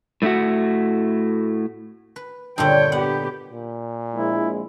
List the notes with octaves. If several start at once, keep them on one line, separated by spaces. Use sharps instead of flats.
A2 A3 D#4 E4 F#4
B4
G2 A#2 D3 C#5 G5
B3 G4 F#5
A#2
A#1 G#3 E4